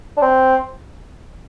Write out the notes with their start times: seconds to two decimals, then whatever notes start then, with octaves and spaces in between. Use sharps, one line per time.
0.17 D4
0.22 C4